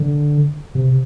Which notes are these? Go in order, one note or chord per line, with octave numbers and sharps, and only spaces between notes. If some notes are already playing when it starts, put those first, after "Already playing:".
Already playing: D3
C3